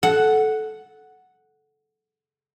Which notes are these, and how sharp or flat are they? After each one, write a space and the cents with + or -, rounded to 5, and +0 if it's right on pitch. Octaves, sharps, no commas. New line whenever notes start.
A4 -15 F#5 +0